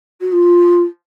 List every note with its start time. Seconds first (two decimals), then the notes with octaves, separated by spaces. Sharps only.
0.21 F#4
0.32 F4